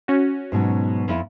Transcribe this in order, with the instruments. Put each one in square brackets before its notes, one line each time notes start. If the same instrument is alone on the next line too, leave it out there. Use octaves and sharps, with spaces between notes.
[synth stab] C#4 F#4
[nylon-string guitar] G#2 B2 F#3
F2 E4